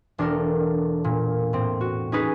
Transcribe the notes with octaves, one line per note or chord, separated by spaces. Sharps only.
E1 D4 A4 A#4
A#2
A2 C4
F#4
C#4 D#4 G#4 B4